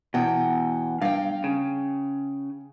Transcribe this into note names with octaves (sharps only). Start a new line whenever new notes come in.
E2 B2 F#5 G5
G2 F5 G5
C#3